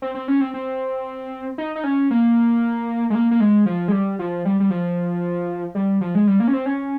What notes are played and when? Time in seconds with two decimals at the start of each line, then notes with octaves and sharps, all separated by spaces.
0.02 C4
0.15 C4
0.28 C#4
0.41 C4
0.54 C4
1.58 D#4
1.76 D#4
1.84 C#4
2.11 A#3
3.10 G#3
3.15 A#3
3.31 A#3
3.40 G#3
3.66 F3
3.88 G#3
3.92 G3
4.19 F3
4.45 G3
4.60 G3
4.70 F3
5.75 G3
6.01 F3
6.15 G#3
6.27 G3
6.40 A#3
6.48 C#4
6.53 C4
6.66 C#4